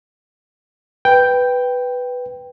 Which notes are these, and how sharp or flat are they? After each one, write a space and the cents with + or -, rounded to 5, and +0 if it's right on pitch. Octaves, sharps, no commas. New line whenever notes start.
B4 +0 G5 +0